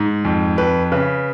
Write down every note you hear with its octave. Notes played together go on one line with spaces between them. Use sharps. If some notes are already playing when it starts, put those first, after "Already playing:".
Already playing: G#2
F2
F2 B4
C#3 B4